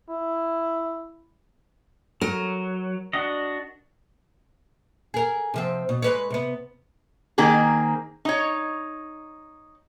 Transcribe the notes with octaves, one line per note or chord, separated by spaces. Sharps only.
E4
F#3 A#4
D4 F#4 D#5
G#4 A#4
C3 F3 C4
B2
G#3 B4 C#5
C3 B3
D#3 A#3 C4 G#4
D#4 C#5